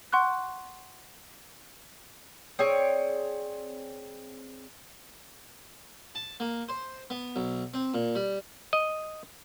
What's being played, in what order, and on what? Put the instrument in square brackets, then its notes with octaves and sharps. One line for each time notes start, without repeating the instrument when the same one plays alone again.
[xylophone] F#5 C6 C#6 F#6
[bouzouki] C4 G#4 C#5 D5
[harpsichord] A5
A#3
C5
B3
B1
C4
A#2
G3
[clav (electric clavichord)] D#5